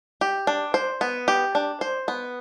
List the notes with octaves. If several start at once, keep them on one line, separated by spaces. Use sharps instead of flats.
G4
D4
C5
B3
G4
D4
C5
B3